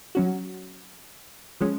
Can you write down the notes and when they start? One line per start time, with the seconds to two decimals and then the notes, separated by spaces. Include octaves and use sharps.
0.15 F#3 C#4 F#4
1.61 F3 G#3 C#4